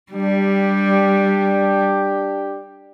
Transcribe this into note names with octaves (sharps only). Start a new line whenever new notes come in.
G3 D4 G4